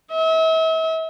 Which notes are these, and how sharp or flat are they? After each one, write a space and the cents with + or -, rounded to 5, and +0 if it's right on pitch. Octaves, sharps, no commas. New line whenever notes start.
E5 -40